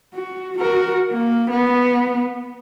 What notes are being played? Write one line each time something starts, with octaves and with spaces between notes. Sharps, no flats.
F#4
F#4 A#4
A#3
B3